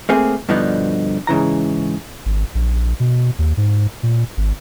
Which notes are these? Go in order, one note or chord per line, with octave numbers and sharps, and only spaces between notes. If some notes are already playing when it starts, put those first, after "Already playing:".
A3 A#3 C4 G#4
G2 B2 D3 F3 B3 D#4
G#2 C#3 E3 A#5
G#1
A#1
B2
D#2
G#2
A#2
G#1